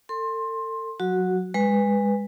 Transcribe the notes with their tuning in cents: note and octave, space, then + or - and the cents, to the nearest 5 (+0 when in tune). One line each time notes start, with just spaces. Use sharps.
A4 +35 C6 +15
F#3 -15 F#4 +0
G#3 -25 B4 +0